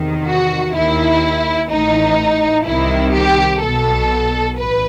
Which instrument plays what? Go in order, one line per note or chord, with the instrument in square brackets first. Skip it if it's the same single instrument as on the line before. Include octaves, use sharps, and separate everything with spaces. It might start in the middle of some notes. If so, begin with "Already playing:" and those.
Already playing: [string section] E2 C3 D#3
F#4
D#2 D#3 E4
A1 A2 E3 D#4
C2 C3 D#3 E4
G4
B1 B2 A4
A1 B4